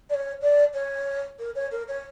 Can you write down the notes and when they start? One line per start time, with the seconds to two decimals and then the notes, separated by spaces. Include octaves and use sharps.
0.09 D5
0.14 C#5
0.41 D5
0.74 C#5
1.39 A#4
1.55 C#5
1.71 A#4
1.88 C#5